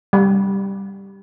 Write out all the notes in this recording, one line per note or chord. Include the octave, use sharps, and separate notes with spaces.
G3